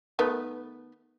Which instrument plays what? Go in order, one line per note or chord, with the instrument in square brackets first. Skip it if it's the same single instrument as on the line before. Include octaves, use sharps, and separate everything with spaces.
[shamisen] D#3 A3 B3